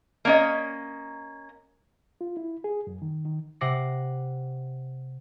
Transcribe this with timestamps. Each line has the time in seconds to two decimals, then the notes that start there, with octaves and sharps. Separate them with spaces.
0.25 A#3 C#4 D#5
2.21 F4
2.37 E4
2.64 G#4
2.87 F#2
3.02 D#3
3.25 D#3
3.61 C3 F#5 D6 A#6 C7